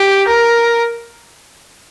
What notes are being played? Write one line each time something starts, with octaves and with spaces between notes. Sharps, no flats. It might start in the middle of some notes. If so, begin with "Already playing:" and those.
Already playing: G4
A#4